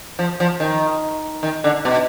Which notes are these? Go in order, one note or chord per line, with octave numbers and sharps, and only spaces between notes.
F3
F3
D#3
D#3
D3
B2